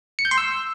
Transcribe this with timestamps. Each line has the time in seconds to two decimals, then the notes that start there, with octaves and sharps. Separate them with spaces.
0.19 C#7
0.25 G6
0.31 C6
0.38 E6